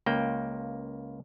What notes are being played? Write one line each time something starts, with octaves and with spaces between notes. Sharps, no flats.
C#2 A#3 G5